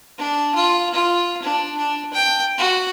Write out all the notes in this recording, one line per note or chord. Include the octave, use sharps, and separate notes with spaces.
D4
F4
F4
D4
D4
G5
F#4